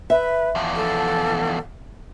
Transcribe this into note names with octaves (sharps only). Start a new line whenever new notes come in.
B4 E5
E2 F3
A4